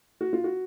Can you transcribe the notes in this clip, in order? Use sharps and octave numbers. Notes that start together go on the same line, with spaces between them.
F#4
F4
F#4